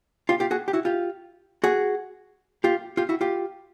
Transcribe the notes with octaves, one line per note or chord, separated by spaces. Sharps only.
F4 G4
F4 G4
F#4 G#4
G4
E4 F#4
F4 G4
F#4 G#4
F4 G4
F4 G4
E4 F#4
F4 G4